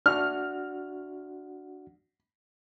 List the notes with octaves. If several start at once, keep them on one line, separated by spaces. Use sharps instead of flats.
D4 F#4 F#5 F6